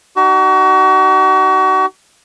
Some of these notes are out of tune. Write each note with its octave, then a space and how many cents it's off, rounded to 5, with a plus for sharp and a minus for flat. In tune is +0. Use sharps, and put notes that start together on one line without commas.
D#4 -30 F#4 +35